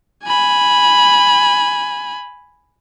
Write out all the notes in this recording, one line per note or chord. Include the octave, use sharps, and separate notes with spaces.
G#5 B5